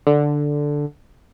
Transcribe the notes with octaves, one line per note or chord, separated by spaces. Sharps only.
D3